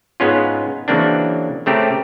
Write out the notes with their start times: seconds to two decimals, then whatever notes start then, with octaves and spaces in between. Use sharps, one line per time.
0.20 G#2 G#3 B3 C#4 F4
0.88 C#3 E3 F#3 A#3 C4 D4
1.66 C#3 A3 C4 G4 A#4